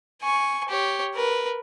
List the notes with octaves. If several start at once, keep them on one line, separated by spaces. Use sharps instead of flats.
G#5 C#6
G4 C#5
A#4 B4